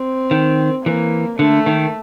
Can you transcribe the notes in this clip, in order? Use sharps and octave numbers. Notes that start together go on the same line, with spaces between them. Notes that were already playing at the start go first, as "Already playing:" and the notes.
Already playing: C4
D#3
E3 A#3
D3 A3
D#3